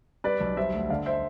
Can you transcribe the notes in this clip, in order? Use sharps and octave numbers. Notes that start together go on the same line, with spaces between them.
G3 B4 D5
B1
G3 C5 E5
D2
D3 D5 F5
C5 E5